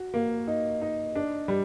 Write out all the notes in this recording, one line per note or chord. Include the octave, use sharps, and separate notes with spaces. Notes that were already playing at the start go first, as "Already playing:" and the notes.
Already playing: F#4
A#3
D#4
D#4
D4
G3